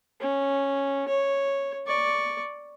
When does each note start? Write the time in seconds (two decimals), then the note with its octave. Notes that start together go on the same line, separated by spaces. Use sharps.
0.20 C#4
1.09 C#5
1.87 D5 C#6